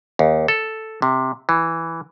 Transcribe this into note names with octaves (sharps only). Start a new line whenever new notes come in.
D#2
A4
C3
E3